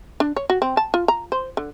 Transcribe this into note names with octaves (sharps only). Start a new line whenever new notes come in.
D4
C#5
F#4
C4
A5
F4
A#5
C5
D3